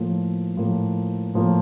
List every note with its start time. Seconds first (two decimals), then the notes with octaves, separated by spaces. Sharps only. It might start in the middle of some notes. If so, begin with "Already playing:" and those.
Already playing: A2 F3 A#3
0.57 A2 F3 A#3
1.35 A2 F3 A#3